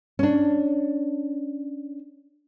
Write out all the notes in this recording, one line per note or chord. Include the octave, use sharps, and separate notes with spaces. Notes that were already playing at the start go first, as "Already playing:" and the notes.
C#4 D4